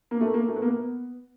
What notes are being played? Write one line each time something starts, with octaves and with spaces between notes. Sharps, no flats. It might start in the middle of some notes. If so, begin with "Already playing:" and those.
A#3
A3
A#3
A3
B3
A#3
B3